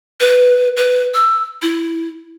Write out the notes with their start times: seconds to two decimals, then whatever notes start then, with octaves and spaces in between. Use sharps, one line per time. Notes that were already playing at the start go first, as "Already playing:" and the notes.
0.20 B4
0.77 B4
1.14 E6
1.62 E4